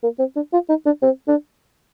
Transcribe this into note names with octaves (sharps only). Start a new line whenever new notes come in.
A#3
C4
D4
F4
D#4
D4
C4
D4